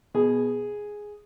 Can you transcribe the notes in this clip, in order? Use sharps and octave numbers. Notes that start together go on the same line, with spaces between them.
B2 G#4